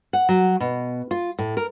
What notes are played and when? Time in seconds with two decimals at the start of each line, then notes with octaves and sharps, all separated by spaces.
0.13 F#5
0.29 F#3
0.60 B2
1.11 F4
1.38 A2
1.57 A#4